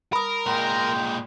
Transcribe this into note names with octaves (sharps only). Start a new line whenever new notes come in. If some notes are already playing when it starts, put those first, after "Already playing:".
A#4 B5 D#6
A#2 G#3 G5